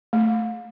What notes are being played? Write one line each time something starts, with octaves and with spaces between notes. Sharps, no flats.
A3